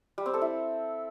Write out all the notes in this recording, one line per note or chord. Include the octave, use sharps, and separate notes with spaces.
G3
C4
A4
E4